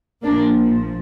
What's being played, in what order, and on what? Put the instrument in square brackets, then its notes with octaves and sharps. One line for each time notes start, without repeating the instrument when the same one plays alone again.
[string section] A#1 A#2 F3 A#3 D4